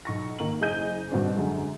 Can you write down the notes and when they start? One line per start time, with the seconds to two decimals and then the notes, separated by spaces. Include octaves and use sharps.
0.05 B1 C#6 A#6
0.39 D#3 A#3 F#7
0.61 F#1 G#4 D#5 G6 D#7
1.11 G2 B2 D#3 C4 D4
1.36 F#2 D3 G#3